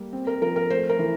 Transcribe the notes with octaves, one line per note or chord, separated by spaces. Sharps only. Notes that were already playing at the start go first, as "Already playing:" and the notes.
Already playing: G3 A#3
C4
A#4
F3 A#4
A#4
A3 C5
A#4
E3